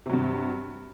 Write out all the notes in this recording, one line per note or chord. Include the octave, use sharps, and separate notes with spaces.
G2 C3 F#3